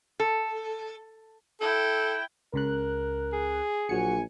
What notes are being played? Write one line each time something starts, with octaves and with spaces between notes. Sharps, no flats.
A4
E4 A4 G5
C#2 C#3 A#4 F#6
G#4
A#1 F#3 F#4 G#5 C#7